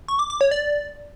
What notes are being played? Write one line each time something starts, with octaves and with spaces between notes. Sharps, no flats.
C#6
D6
D6
C#5
D5